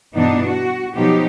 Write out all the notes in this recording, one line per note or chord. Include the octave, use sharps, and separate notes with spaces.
G2 B2 E3 B3 D4 D#4
F#4
B2 F3 F#3 B3 D#4 G4